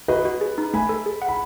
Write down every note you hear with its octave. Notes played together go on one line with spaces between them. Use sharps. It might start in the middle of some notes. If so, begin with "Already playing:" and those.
F#4 B4 D#5
F#4
G#4
D#4
A3 G#5 B5
A4
G#4
F#5
B5